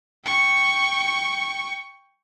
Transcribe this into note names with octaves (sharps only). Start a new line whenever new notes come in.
G5 C#6